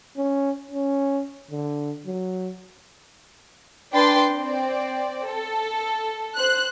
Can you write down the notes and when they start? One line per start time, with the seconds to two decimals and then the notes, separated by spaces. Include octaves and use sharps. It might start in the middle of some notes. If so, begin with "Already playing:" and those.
0.17 C#4
0.72 C#4
1.51 D3
2.06 F#3
3.93 D4 B4 G5 C6 A6 C7
4.32 C4 D5
5.27 A4
6.36 C5 F#6